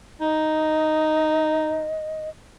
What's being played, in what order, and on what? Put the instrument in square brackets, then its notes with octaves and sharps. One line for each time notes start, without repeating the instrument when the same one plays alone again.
[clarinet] D#4 [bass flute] D#5